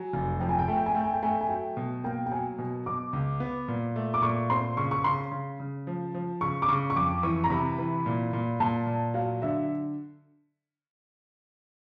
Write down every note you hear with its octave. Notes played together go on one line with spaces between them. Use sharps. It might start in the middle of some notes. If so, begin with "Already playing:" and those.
Already playing: F#3 G#5
F1
F3 G5
G#5
G5
A3 G#5
G5
G#5
A3 G5
G#5
G5
A3 G#5
G5
G#5
F#3 G5
B2
A#3 G5
G5
F#3 G#5
B2
B2 D6
C#2
B3
A#2
A3
D6
A#2 C#6
C4 C6
C#3 C#6
C#6
C#3 C6
C#3
C#3
F3
F3
C#3 C#6
D6
C#3 C#6
C#6
F2 D6
E3 C#6
A#5
C3 B5
E3
A#2
A#2
A#2 A5
A#2
F#3 F5
D3 E5